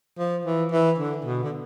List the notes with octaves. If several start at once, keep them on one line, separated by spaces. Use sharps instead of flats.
F3
E3
E3
D3
B2
D3